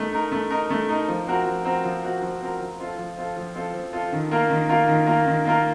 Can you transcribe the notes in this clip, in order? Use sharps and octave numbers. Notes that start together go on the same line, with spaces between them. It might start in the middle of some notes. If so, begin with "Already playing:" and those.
Already playing: A3 D#4 A#4
D#4 A#4
A3
D#4 A#4
A3
D#4 A#4
F3
C4 F#4 A#4
F3
C4 F#4 A#4
F3
C4 F#4 A#4
F3
C4 F#4 A#4
F3
C4 F4 A4
F3
C4 F4 A4
F3
C4 F4 A4
F3
C4 F4 A4
D#3
A#3 F4 A#4
D#3
A#3 F4 A#4
D#3
A#3 F4 A#4
D#3
A#3 F4 A#4